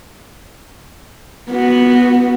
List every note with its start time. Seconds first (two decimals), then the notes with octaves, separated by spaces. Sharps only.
1.51 B3 F#4